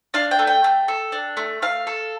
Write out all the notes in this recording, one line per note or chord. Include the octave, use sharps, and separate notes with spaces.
D4 F5
G5
A3
G5
A3
A4
D4
A3
A3 F5
A4